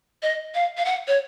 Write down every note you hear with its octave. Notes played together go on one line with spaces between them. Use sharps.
D#5
F5
F5
F#5
C#5